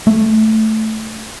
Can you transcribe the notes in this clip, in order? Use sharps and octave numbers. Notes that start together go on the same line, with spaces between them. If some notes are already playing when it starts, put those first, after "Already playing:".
A3